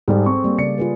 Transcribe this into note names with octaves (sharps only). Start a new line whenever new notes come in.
G#2 G3 G#4 A4
C4 C#6
G3 A#3
C#3 D5 C#7
F4 G#4 B4